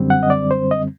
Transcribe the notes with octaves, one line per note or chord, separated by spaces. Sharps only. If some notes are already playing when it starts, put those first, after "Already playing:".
Already playing: F#2 D3 G3 C4
F#5
D#5
D5
C5
D#5